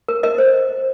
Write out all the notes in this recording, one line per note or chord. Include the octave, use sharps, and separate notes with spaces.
A#4
A#4 D#5
C5